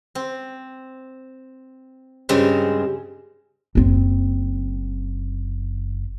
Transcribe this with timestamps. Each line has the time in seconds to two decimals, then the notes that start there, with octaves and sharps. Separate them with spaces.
0.15 C4
2.29 G2 C#3 G#3 C4
3.75 F#1 C4